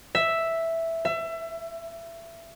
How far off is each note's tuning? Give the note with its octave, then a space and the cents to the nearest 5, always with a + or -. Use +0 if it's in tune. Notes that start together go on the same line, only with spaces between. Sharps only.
E5 +0
E5 +25